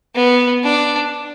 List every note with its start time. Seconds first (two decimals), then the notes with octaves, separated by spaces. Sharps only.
0.16 B3
0.64 D4